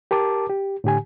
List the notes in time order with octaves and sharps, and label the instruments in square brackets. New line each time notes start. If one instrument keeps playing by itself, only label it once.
[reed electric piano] G4 A#4 A5 D6
G4
A2 D3 G4 G#5